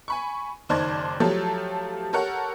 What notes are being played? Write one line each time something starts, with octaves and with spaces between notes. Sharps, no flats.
G#5 B5 C#6
F#1 D#3 C5 D5 A5 G#6
F3 F#3 A3 G4 A4
G4 A4 A#4 C#5 F#5